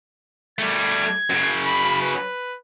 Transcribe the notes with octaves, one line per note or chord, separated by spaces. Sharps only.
G3 A3 G#6
F#2 C#3
B5
B4